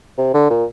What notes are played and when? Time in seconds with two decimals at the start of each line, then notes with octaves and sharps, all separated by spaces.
0.18 C3
0.34 D3
0.50 A#2